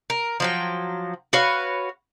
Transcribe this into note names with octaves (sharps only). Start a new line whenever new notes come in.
A#4
F3 F#3 G5
F#4 B4 C#5 F5